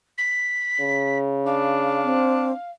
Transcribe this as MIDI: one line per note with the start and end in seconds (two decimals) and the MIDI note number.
0.18 1.18 95
0.81 2.24 49
1.46 2.54 62
1.46 2.71 77
2.04 2.52 60